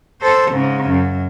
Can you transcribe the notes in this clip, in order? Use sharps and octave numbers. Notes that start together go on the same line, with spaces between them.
A4 C5
G#2 C#3
F#2